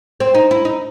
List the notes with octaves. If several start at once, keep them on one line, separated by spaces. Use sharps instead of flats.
C4
D#4
E4
D#4